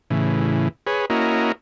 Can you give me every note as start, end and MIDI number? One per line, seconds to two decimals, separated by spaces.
0.10 0.68 45
0.10 0.68 49
0.10 0.68 52
0.87 1.05 68
0.87 1.05 71
0.87 1.05 73
1.10 1.52 58
1.10 1.52 61
1.10 1.52 64
1.10 1.52 66
1.10 1.52 70
1.10 1.52 75